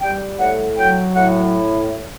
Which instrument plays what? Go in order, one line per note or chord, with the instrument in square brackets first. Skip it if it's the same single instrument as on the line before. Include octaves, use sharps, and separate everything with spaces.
[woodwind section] G3 G5
A2 F#5
F#3 G5
A2 F#5